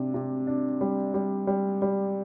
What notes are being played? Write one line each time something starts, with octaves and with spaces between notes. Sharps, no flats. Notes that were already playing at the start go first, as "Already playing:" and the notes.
Already playing: C3 D4
C3
D4
G3
G3
G3
G3